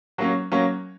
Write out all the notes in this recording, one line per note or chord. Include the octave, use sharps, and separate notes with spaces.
F#3 A#3 C#4
F#3 A#3 C#4